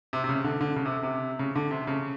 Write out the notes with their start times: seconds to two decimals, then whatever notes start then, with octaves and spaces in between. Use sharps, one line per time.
0.13 C3
0.24 C3
0.29 C#3
0.44 D3
0.61 D3
0.76 C#3
0.86 C3
1.03 C3
1.39 C#3
1.55 D3
1.71 C3
1.87 C#3